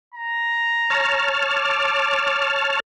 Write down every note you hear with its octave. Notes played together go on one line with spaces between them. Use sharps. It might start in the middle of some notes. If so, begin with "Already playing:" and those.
A#5
C#5 A5 F6
D6